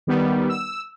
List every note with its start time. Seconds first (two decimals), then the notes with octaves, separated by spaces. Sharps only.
0.07 D#3 G3 B3
0.49 E6